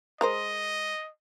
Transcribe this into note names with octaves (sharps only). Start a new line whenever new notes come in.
G#3 A#4 C5 D#5